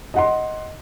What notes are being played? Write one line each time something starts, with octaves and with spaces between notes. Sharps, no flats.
D#5 F#5 C6